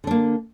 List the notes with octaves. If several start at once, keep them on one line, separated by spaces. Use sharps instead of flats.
D3 A#3 D4